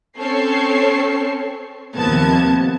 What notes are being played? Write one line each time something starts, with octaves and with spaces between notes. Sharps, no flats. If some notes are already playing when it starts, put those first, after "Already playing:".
C4 C#4 A4 C#5 C#6 C7
D#2 C3 F3 B3 A5 G#6